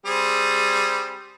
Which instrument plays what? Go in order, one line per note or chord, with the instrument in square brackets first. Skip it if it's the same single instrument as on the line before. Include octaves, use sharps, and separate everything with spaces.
[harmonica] G3 C4 G#4